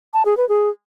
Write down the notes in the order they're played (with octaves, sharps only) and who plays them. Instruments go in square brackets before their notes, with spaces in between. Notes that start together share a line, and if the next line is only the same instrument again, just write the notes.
[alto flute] A5
G#4
B4
G#4